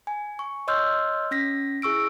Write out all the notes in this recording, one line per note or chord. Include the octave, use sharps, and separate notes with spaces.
G#5
C#6
C#5 D#5 C6 E6 F6 G6
C#4 A#6 B6
E4 G#4 C#6 E6 D7